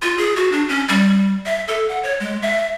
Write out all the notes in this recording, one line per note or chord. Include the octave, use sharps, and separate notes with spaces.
F4
G#4
F#4
D4
C#4
G3
E5
A4
F#5
C#5
G#3
E5